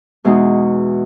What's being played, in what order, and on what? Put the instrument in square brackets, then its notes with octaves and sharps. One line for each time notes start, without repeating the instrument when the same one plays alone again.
[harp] E2 B2 G#3 D#4 F#4